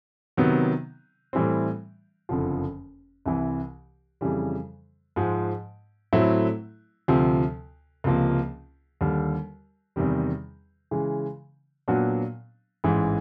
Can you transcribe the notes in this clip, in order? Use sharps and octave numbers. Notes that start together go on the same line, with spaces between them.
C3 D#3 F#3 B3
A2 E3 G3 C4
F#1 F2 D3 F3
C2 C3 E3
F2 C#3 E3 G3
G#2 F3 G#3
A2 F#3 A3 C4 E4
D2 C3 F3
C#2 C3 F3 A#3
D#2 D3 G3
E2 C3 D#3 G3
C#3 E3 G#3
A#2 F#3 B3 D4 F#4
A1 G#2 E3 G#3